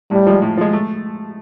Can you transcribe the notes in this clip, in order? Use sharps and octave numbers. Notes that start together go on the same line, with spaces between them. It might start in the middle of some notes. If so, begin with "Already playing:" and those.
A2 G3
F3 G#3
A2
F3 G#3
A3